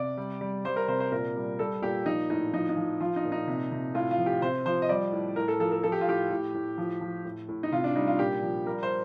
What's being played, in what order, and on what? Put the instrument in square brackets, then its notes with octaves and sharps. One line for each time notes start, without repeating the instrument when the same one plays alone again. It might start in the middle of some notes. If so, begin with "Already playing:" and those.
Already playing: [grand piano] C3 D5
G3
G3
G3 C5
A#4
C3 C5
C5
A#2 A#4
G3
G3 A4
A#2 G4
F3 D#4
A2 D#4
F3 D#4
D#4
F3
F3 F4
D#4
A#2
D#4
C3
C3
A2 F4
F4
F3
G4
C3 C5
F3 C5
D#5
G3 D5
A2
A2 A#4
A4
F3 A4
A4
F3 A4
G4
F4
A2 G4
A2
A2
F3
F3
A2
A2
D#4
C3 F4
D4
G3 D#4
F4
A#2 G4
F3
G3 A#4
C5